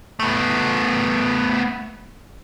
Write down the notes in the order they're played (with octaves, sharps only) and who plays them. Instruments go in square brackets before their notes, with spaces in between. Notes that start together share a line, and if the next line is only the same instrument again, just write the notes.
[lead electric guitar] A3 B3